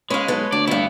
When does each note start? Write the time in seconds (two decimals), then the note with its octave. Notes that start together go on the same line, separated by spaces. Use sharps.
0.10 C#3 G#3 B4 C#5 F5
0.28 B1 A4 B4
0.52 D2 D5 A5
0.67 E2 G2 B3 E4